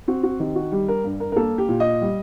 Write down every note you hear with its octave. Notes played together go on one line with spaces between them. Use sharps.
C4 F#4
F#4
D#3 G4
F#4
G3 G4
A#4
G2
A#4
A#4
A#3 A4
G4
A#2
D#5
G3